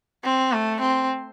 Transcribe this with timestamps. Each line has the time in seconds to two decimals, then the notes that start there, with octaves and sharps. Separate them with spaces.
0.24 C4
0.52 A3
0.81 C4